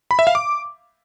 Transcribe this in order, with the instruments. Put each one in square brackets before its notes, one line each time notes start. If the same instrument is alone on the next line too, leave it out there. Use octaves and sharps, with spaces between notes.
[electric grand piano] B5
E5
F5
D6